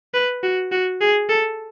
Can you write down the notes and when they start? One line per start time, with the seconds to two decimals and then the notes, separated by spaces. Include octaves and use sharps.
0.14 B4
0.43 F#4
0.72 F#4
1.01 G#4
1.29 A4